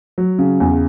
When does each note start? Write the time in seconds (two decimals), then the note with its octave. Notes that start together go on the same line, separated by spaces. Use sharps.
0.18 F#3
0.39 C#3
0.60 E2